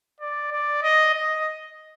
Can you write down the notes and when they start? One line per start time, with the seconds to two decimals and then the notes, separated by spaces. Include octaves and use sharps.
0.20 D5
0.52 D5
0.82 D#5
1.14 D#5